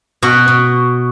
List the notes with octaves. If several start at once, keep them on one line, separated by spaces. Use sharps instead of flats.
B2 F#4
B2